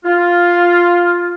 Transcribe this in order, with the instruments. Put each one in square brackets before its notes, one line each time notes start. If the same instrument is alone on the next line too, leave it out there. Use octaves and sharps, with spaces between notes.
[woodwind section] F4